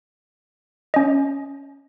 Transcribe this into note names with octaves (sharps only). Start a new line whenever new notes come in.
C#4 D#5